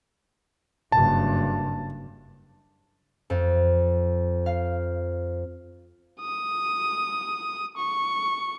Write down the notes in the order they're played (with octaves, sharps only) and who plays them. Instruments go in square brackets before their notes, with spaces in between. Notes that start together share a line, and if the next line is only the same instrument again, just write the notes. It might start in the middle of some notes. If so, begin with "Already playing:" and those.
[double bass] F#1 G2 [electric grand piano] A5
[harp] F2
F5
[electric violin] D#6
C#6